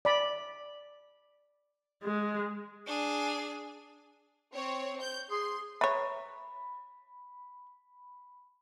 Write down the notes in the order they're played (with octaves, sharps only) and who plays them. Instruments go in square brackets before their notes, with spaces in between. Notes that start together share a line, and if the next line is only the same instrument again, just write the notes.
[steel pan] D5 B5
[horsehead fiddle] G#3
[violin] D4 G#4
[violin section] C4 C#5
G6
[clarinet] G#4 [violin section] C6
[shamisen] B4 C#5 [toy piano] E5 A#5 C#6 [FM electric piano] B5